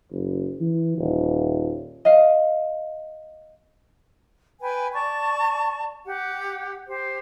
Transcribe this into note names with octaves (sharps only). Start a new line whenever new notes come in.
F#1
E3
D#1
D#5 F5
B4 G5 G#5
D5 A5 C#6
G4 F#5
G4 C5